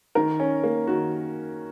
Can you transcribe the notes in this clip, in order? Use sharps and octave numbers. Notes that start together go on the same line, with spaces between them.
D#3 A#4
C#4
A#3
D#3 F#4